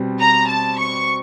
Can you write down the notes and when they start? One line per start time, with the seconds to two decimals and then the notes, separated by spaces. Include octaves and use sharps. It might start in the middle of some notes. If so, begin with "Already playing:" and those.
Already playing: B2 G3 C4
0.20 A#5
0.48 A5
0.78 C#6